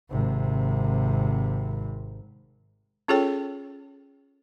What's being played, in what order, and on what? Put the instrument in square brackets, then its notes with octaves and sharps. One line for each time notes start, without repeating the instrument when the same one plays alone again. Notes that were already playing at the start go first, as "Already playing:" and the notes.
[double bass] G#1 C3
[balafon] C#4 F4 G#4 A4 C#5 G5